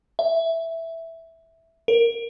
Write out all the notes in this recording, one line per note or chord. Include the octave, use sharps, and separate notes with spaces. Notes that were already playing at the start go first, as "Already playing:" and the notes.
E5
A#4